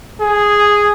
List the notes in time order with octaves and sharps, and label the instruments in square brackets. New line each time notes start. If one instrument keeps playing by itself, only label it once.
[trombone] G#4